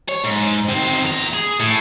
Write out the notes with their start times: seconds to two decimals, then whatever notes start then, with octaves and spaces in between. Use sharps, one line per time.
0.09 C#5
0.24 G#2
0.69 D#3 C4
1.05 E2 A#5
1.34 G#4
1.60 A2